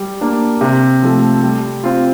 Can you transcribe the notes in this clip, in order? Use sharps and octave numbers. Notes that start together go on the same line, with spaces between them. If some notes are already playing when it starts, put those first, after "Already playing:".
Already playing: G3
A#3 D4
C3
F3 A3
G3
C4 F4